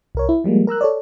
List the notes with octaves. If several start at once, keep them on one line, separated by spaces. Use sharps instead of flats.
C2 A#4 C#5
E4
F3 G3 G#3 A#3
A#4 A#5 E6 F#6
A4 C#5 D5